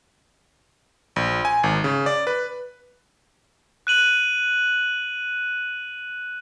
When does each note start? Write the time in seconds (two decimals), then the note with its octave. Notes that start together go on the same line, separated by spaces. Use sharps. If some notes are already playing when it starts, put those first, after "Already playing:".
1.16 A#1
1.45 G#5
1.63 G#1
1.84 C#3
2.06 D5
2.27 B4
3.87 F#6 D#7 F#7